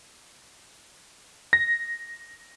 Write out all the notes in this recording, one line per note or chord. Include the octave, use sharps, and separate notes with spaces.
A#6